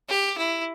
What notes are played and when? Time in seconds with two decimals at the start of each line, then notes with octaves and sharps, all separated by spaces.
0.09 G4
0.38 E4